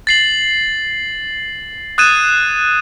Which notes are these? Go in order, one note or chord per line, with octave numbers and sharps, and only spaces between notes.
A6 C7 F#7
D#6 F#6 G#6 A6 D#7 E7